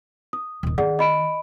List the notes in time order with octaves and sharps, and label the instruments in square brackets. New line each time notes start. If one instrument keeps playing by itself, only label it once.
[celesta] D#6
[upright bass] D#1 D#3
[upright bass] D#3 [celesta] G#4 D5 F#5
[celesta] D#5 B5 D7